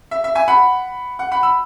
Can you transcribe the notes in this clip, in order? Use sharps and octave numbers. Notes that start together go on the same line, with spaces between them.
E5
E5
E5 G#5
F#5 B5
F#5
F#5 B5
B5 E6